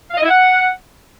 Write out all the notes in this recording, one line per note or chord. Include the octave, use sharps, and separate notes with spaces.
F5
D#5
E4
F#5